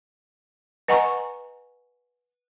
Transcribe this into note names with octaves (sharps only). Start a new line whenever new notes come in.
B4 D#5 F#5 G#5 A#5 C#6